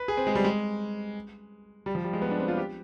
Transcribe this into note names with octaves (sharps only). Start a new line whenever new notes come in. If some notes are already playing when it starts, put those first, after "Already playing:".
Already playing: B4
G#4
C4
G#3
G3
G#3
G3
F3
G3
G#3
B3
D4
C4
F4
G4